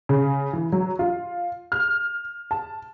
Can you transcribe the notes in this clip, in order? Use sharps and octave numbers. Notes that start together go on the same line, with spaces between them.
C#3
E3
F#3
F4
F6
A5